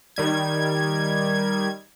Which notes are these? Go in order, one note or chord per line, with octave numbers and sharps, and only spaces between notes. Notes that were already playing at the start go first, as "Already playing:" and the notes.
D#3 G3 G#6